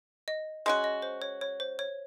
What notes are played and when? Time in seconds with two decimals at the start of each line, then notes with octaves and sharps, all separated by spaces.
0.28 D#5
0.66 G#3 C#4 F#4
0.84 D#5
1.02 C5
1.22 C#5
1.41 C#5
1.60 C5
1.79 C#5